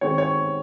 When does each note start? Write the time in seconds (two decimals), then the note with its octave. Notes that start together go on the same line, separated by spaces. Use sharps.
0.01 D#3 G#3 C4 C#5
0.18 C#5